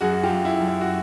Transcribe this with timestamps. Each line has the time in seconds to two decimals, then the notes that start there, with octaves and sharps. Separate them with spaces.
0.01 F#2 F#4 G#4
0.13 F#4
0.23 F4 G4
0.30 F#2
0.45 E4
0.60 F#2
0.67 E4
0.81 F#4